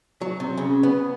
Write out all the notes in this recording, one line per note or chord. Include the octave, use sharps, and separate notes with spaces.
F#3
C3
C#3
B3